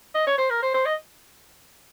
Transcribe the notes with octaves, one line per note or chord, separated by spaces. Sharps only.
D#5
C#5
C5
A#4
C5
C5
D#5